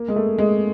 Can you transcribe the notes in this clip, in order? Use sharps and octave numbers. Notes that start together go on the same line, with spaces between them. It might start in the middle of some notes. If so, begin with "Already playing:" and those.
Already playing: A#3
G#3
A3
G#3